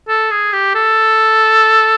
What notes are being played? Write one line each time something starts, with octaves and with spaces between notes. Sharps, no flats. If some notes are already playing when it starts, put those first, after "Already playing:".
A4
G#4
G4
A4